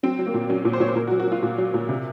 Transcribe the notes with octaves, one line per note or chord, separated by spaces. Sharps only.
F#3 C4
F#3
A#3
A#2
F#3 C#4
A#2
C5
A#2 C#5
C5
A#2 A#4
F#4
F#3
F#4
F#3 F4
A#2
F#3
A#2
C3